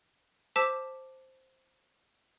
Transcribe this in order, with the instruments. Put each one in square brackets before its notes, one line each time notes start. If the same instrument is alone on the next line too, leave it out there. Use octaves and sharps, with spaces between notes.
[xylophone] C5 A5 D6 E6 B6 E7